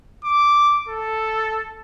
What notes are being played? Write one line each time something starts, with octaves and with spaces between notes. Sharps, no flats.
D6
A4